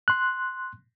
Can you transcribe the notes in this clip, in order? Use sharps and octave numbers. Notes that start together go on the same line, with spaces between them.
C6 F#6